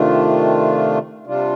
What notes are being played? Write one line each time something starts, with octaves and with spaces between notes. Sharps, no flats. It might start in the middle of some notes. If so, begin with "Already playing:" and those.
Already playing: C3 D#3 A3 D4 F4
C3 G3 D4 F4